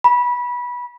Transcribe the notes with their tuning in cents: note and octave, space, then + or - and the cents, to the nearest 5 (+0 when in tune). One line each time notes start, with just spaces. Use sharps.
B5 -20